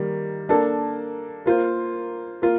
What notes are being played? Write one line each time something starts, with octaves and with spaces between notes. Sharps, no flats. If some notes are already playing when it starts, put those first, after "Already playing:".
Already playing: D#3 G3 A#3
A#3 D4 A4
A#3 F4 C5
A#3 F4